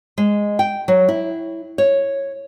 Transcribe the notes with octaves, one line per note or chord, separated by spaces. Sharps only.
G#3
G5
F#3
E4
C#5